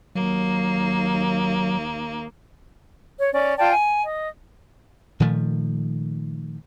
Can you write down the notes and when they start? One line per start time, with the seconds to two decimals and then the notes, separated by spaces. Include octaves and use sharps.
0.15 D#2 F#3 A#3
3.19 C#5
3.33 C#4 D5
3.58 F4 D5 G5 A5
3.73 G#5
4.02 D#5
5.20 A#2 D#3 F3 A3